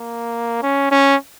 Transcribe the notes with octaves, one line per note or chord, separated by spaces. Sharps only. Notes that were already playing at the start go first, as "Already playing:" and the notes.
Already playing: A#3
C#4
C#4